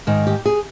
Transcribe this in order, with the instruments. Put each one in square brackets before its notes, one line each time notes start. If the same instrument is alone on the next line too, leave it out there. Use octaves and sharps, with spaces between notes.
[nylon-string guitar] G#2 D#3
G4
G#4